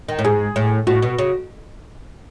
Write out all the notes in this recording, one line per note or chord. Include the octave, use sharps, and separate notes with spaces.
D#3
A2
G#2 G#4
A2
A2 F#4
B2
C#3